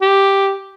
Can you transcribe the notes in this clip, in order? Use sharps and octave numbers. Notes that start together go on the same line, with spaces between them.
G4